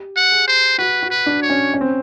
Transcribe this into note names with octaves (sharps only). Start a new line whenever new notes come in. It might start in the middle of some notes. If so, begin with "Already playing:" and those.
Already playing: G4
F#5
G#4
C5
F#4 B4
F#4
B4
D4
C#5
C#4
C#4
C4